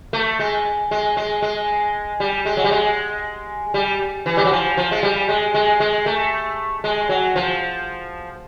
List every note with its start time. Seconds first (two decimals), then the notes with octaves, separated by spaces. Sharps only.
0.13 A3
0.39 G#3
0.91 G#3
1.17 G#3
1.42 G#3
2.20 G3
2.45 G#3
2.57 F#3
2.64 G3
2.71 G#3
3.74 G3
4.26 E3
4.37 G3
4.45 F#3
4.51 F3
4.77 F3
4.91 G#3
5.03 G3
5.29 G#3
5.54 G#3
5.80 G#3
6.06 A3
6.84 G#3
7.09 F#3
7.36 F3